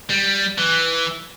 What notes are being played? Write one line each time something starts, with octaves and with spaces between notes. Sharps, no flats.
G3
E3